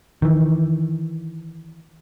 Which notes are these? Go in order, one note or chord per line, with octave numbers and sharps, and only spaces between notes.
D#3 E3